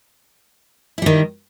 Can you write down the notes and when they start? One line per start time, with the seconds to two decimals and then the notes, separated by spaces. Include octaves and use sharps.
0.98 E4
1.02 G3
1.06 D#3